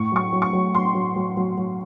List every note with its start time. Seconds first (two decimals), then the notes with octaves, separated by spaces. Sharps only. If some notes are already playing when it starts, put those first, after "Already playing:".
Already playing: A2 C#6
0.12 F#3 C#6
0.33 F#3
0.42 C#6
0.53 F#3
0.75 F#3 C6
0.95 F#3
1.16 F#3
1.37 F#3
1.57 F#3